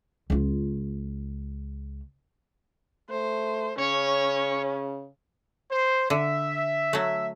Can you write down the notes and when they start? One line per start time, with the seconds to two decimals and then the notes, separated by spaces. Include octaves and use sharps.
0.30 C#2 F4
3.10 A3 C5
3.79 C#3 C#4 C#5
5.70 C5
6.10 D3 E5
6.93 F#3 A3